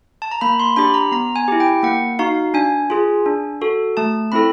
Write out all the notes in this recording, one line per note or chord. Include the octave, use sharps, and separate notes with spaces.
A5
A#5
A#3 B5
C6
D4 G4 B5
A#5
B3 A#5
G#5
E4 G4
G5
A#3 F#5
D#4 F#4 F5
D4 G#5
F4 G#4
D4
F#4 A4
A3 A5
C4 E4 A4 B5